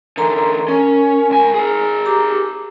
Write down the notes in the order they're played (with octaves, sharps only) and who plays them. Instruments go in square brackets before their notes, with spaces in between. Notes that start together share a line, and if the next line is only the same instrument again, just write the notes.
[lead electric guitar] D3 E3 [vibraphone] A#4 A#5 C6
[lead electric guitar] C#4 [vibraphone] A#4
[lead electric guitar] C#2 G#5
G#4 A#4
[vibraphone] G4 A#5 D6